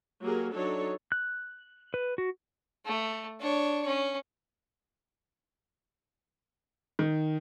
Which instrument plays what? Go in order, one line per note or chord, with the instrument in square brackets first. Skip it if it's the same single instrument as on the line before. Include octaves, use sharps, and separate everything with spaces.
[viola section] F#3 A#3 G4 G#4 A#4
F#3 D4 D#4 A4 C#5
[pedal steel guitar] F#6
B4
F#4
[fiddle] A3
D4 C#5
C#4
[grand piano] D#3